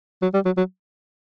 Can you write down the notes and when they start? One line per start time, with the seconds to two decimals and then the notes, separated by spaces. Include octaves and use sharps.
0.22 F#3
0.34 G3
0.45 F#3
0.57 F#3